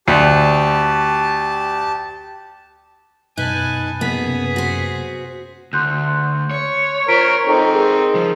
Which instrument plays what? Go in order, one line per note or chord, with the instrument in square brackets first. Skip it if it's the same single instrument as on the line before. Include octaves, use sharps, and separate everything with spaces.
[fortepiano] D2 [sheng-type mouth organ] G4 A5
[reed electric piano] F#2 B2 [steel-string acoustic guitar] D#4 [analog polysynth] B4 F#6 [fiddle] G#5 A5
[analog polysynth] F#2 B6 [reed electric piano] C3 A#3 [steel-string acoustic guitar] B3 [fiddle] G#4
[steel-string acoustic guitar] F#4 C5
[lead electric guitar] D2 [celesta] C6 F#6 G6
[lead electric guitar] C#5
[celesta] F4 B6 D7 [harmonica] A#4 C5
[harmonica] C4 D#4 [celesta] A4
[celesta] G#4 A#4
[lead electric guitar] F3